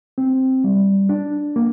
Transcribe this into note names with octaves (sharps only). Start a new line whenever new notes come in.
C4
G3
D4
A#3